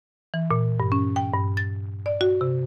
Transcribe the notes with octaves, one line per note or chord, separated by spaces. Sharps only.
E3
A#2
G2
C#4
G5
G2
A6
D5
F#4
C3